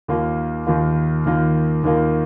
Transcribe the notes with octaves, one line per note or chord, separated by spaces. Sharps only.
D#2 D#3 A#3 F4
D#2 D#3 A#3 F4
D#2 D#3 A#3 F4
D#2 D#3 A#3 F4